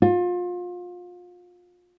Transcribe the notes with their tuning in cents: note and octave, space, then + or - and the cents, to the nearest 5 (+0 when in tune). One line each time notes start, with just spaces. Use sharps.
F4 +30